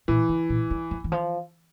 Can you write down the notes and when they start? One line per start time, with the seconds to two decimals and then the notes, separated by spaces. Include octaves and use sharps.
0.08 A#2 E3
0.29 C#3
0.50 A#2
0.70 G3
0.91 F3
1.04 E3
1.12 F3